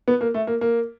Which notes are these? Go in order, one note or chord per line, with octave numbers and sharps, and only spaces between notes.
B3
A#3
A3
A#3
A#3